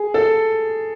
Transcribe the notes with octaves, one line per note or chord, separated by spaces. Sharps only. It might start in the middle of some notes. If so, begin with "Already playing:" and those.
Already playing: G#4
A4